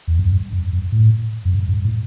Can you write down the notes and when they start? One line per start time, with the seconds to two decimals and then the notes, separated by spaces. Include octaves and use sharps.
0.08 E2
0.19 F#2
0.31 G2
0.53 F#2
0.73 F#2
0.92 A2
1.45 F#2
1.54 G2
1.68 G2
1.85 A2